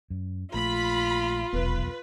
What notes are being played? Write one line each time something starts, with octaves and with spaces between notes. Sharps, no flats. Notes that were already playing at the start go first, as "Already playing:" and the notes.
F#2
A#1 A3 F4 B5
D#1 B1 E2 B3 B4